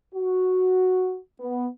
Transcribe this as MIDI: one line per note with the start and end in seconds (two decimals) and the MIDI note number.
0.14 1.17 66
1.40 1.67 59